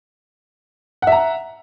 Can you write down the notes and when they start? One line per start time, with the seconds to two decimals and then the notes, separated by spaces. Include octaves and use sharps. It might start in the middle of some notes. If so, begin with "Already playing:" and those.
1.02 F#5
1.07 E5
1.12 A#5